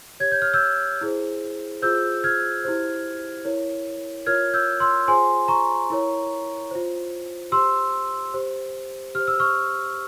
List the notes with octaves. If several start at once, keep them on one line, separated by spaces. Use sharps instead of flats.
G4 C#5 G#6
G6
F6
E6 G6
E4 G#4 C5
F4 G#4 C5 E6 G6
F6 G#6
E4 G4 C5
E4 A#4 C#5
F4 A#4 C#5 F6 G#6
E6 G6
C6 E6
F4 G#4 C5 G#5 C6
A#5 C#6
E4 A#4 C#5
F4 C5
G4 C5 C6 E6
G4 C5
G4 C5 F6
E6
C#6 F6